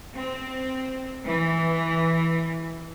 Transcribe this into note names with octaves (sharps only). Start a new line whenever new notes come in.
C4
E3